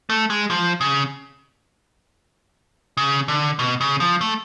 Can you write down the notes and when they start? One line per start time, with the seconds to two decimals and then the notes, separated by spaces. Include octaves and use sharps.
0.10 A3
0.30 G#3
0.50 F3
0.81 C#3
2.97 C#3
3.28 D3
3.59 B2
3.81 C#3
4.00 F3
4.21 A3